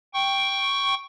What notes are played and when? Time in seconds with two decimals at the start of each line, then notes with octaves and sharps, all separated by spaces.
0.14 G5 C#6